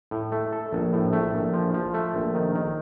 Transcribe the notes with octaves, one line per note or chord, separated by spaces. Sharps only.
A2
A3
A4
A#1
A2
A3
A#1
F3
F3
A3
A#1
D#3
D#3